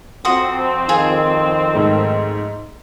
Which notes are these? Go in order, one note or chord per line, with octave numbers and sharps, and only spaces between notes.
F2 C4 F#4 C6 D#6
D#3 F4 G#4
G#2 A3